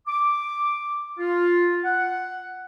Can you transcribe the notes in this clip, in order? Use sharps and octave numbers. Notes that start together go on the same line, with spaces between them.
D6
F4
F#5